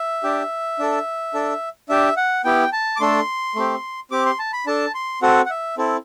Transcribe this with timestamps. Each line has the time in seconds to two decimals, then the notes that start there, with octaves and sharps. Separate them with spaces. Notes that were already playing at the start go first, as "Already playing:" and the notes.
Already playing: E5
0.23 D4 G4
0.79 D4 A4
1.34 D4 A4
1.89 D4 G4 E5
2.17 F#5
2.45 B3 E4 G4 G5
2.73 A5
2.96 D6
3.00 A3 D4 A4 C6
3.55 A3 C4 G4
4.11 C4 G4 D6
4.26 C6
4.39 A5
4.53 B5
4.66 D4 A4 A5
4.95 C6
5.22 C4 F#4 A4 F#5
5.46 F#5
5.50 E5
5.77 C4 E4 A4